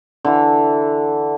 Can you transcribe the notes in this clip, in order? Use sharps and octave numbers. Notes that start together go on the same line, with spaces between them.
D3 E3